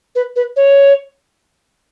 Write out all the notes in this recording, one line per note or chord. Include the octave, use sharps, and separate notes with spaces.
B4
B4
C#5